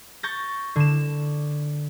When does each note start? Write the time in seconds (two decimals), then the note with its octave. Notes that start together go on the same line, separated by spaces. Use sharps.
0.23 C#6 G6 A6 A#6
0.76 D3 E7